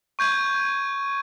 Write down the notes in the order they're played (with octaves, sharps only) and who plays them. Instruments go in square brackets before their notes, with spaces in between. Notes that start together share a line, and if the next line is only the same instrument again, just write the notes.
[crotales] C#6 G6 G#6 D#7